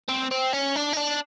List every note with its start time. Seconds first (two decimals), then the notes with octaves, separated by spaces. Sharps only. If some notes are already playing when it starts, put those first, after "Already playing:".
0.09 C4
0.31 C4
0.53 C#4
0.76 D4
0.93 D#4
0.97 D4